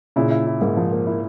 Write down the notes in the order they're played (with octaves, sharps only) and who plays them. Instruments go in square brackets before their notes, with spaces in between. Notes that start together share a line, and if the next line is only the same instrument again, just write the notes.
[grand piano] A#2 C#3 [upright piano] E4
[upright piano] E4
E4
[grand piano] G#2 [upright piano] A#3
[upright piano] F3
A#3
E4